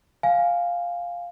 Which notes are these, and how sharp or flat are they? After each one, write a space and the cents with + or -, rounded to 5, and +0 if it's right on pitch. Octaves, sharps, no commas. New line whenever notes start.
F5 +5 G#5 +0